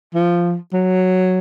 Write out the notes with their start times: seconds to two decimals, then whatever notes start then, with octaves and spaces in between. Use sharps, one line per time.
0.14 F3
0.73 F#3